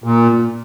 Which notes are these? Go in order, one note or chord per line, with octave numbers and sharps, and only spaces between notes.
A#2